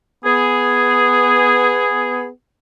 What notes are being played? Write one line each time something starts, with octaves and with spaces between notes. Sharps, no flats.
B3 G#4